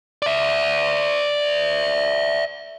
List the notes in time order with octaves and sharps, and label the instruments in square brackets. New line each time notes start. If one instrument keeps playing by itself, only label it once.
[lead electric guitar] D5 E5